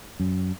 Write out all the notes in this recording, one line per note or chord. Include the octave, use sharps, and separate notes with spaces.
F#2